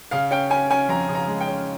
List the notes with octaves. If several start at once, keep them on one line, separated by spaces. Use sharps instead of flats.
C#3 F5
C#4 G5
C#4 G#5
C#4 G#5
F2 A#5
C#3
A#5
G#3
G5
C#4